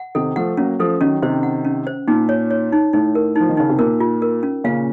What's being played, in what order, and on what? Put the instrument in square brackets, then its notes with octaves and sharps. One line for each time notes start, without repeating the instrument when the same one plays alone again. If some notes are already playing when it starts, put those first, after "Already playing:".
Already playing: [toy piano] F#5
[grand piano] C3 D#3 [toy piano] A4
[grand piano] F3 A3 [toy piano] F#5
[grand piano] F#3 A#3 [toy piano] C#4
[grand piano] F3 A3 [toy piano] A4
[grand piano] D#3 F#3 [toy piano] C#4
[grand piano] C3 D#3 [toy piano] C5
[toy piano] F#5
C#4
C5
[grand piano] A#2 [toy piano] D#4
[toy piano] C#5
C#5
D#4
[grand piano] A2 [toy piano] D#4
[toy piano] A#4
[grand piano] F3 [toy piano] D#4
[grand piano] D#3
[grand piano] C#3 [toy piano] D#4
[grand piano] C3
[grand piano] A#2 [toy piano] A#4
[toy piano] F4
A#4
C#4
[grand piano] A#2 C#3 [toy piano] F5